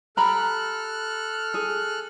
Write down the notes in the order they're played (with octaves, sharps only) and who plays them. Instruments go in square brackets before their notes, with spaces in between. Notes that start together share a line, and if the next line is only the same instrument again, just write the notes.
[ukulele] G4 A#5 B5 [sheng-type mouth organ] A4 F6 F#6
[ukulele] G#4